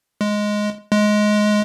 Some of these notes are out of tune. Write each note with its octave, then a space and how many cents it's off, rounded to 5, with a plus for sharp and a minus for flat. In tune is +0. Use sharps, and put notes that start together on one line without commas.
G#3 +5
G#3 +15